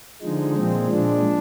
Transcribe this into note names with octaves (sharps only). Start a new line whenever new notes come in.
D3 F3 G#3 D#4
A#2 F3 G#3 C4
A#2 F3 G#3 D4